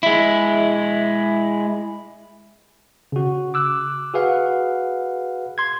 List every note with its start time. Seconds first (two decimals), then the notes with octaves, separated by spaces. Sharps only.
0.03 G#3 E4
3.12 C#3 F#4
3.54 D6 E6 F#6
4.14 F#4 G#4 B4 F5 F#5
5.58 C6 G#6